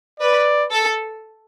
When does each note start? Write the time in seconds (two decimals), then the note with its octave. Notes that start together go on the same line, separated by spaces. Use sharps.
0.20 B4 D5
0.71 A4